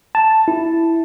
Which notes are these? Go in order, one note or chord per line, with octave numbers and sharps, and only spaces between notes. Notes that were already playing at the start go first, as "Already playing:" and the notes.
A5
E4